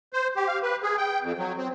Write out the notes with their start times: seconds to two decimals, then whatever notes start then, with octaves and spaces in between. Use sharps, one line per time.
0.13 C5
0.36 G4
0.48 F5
0.63 B4
0.83 G#4
0.98 G5
1.22 F2
1.39 F#3
1.58 C4